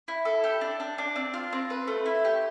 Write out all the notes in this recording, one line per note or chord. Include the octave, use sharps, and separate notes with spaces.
E4
A4
G4
D4
D4
D4
C4
F4
C4
B4
A3
E4
G4